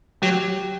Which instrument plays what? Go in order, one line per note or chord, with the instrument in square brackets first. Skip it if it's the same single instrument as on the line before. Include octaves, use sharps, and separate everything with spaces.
[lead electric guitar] F#3 [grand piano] G4